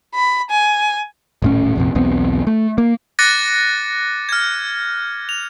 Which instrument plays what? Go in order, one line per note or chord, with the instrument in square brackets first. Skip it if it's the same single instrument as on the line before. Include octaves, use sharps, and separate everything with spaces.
[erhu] B5
G#5
[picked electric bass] D#1 A2 C#4
A#1 F2 C3
B1 E2 B3 C4
A3
A#3
[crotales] D6 F#6 A6 A#6 C#7 D#7
F6 G#6
F7